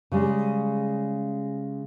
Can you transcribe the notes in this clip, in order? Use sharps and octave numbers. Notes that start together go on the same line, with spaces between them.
C#3 G3 G#3